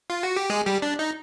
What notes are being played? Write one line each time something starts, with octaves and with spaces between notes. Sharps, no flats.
F4
F#4
G4
G#3 G#4
G3 G4
D4
D#4